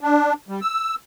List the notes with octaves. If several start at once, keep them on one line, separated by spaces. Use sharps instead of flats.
D4
G3
E6